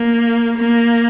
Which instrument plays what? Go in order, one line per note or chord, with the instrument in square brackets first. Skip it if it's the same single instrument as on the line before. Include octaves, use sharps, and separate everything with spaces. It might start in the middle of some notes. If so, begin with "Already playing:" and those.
Already playing: [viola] A#3
A#3